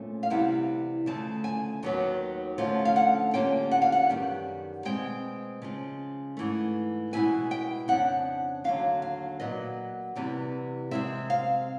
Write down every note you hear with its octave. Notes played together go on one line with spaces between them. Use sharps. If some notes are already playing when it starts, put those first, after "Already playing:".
Already playing: A#2 F3 A3 C#4
F5
C3 E3 G3 B3 E4 F#5
D2 C#3 F3 A3 A5
G#5
D#2 D#3 F#3 B3
D3 F3 A3 C#4 F4
F5
F#5
D3 G3 A#3 C#4 F4 G5
F#5
F5
F#5
F#2 D#3 G3 B3
B2 G#3 C4 G5
C#3 F3 G#3
G#2 E3 A3
B2 G#3 B3 E4 G#5
G5
F2 C#3 D4 F#5
D#2 D3 F#3 F5
F5
A#2 F#3 B3 D#5
E2 C3 E3 G3 B3
C3 E3 G#3 C4 E5
F5